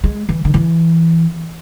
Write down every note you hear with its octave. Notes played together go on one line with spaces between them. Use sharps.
G#3
E3
D#3
E3